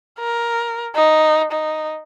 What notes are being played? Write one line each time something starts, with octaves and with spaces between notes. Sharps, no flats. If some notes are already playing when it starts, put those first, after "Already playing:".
A#4
D#4
D#4